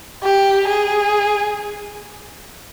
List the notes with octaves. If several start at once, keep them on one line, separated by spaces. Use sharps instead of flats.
G4
G#4